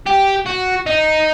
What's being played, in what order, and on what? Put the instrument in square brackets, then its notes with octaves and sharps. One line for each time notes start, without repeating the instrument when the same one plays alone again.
[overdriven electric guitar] G4
F#4
D#4